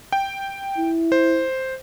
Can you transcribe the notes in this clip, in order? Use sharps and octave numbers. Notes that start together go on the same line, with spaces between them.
G5
E4
C5